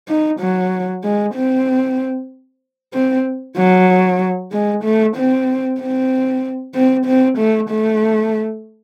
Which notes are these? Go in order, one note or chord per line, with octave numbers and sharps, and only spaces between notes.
D#4
F#3
G#3
C4
C4
F#3
G#3
A3
C4
C4
C4
C4
A3
A3